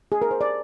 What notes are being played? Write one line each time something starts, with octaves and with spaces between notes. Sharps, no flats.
G#4
A#4
C5
D5